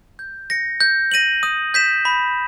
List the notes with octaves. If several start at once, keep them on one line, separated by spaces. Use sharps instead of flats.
G6
A#6 C#7
G6
A#6 D#7 F#7
D#6
G6 B6 E7
B5